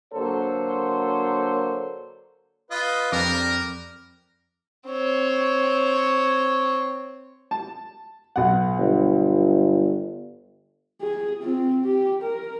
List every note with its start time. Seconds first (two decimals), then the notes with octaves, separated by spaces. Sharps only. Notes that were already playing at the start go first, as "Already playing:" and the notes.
0.14 D3 F#3 A#3 A4 C5 C#5
2.71 F4 B4 D#5
3.12 F2 G3 D4 A#4 D6
4.88 C4 C#5
7.51 A5
8.36 B1 F#5
8.78 G1
11.01 G#4
11.43 C4 F4
11.82 G4
12.22 A#4